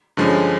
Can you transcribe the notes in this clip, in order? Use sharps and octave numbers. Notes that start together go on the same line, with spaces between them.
G2 D3 F3 G#3 C#4